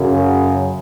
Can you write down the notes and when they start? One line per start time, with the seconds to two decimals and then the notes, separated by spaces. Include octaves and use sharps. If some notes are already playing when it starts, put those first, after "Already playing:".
Already playing: F#2 C#3